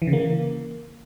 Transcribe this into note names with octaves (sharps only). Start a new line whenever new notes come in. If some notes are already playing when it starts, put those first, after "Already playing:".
E3
C#3
A#3